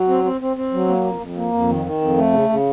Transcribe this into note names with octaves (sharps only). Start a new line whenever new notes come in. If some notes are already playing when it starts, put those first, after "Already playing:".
Already playing: F#3
C4
C4
C4
C4
F#3
A#3
F2
F2
A#3
F2
D#3
D#3
F2
A3
C#3
C#3